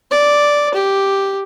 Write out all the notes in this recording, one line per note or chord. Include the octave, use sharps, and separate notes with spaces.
D5
G4